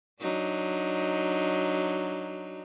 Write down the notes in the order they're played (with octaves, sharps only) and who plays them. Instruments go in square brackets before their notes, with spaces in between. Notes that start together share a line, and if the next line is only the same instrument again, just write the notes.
[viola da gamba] F#3 D4 D#4